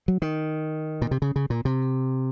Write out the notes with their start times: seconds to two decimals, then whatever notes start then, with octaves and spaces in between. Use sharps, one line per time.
0.08 F#3
0.22 D#3
1.02 A#2
1.11 C3
1.22 C#3
1.36 C#3
1.50 A#2
1.65 C3